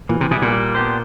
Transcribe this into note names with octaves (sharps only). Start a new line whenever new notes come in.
A#2 E3
C3
B2 G3 B3 E4 G#4
A#2
G3
B3 D4 G4 C5